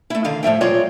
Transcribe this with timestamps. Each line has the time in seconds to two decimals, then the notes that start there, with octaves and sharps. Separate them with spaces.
0.10 A3 E4
0.24 D3 D#3 F5
0.43 A2 F3 E5 G5
0.61 F#3 G#3 C4 F4 C#5 D5